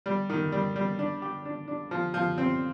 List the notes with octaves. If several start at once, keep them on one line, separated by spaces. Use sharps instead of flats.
G3
D#3
G3
G3
D4
G4
D4
D4
F3
F3
C4